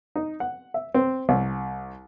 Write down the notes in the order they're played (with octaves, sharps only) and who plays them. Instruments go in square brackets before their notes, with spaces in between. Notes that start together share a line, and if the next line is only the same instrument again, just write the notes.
[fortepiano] D#4
F#5
E5
C4
C2